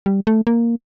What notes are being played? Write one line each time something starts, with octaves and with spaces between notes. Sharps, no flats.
G3
A3
A#3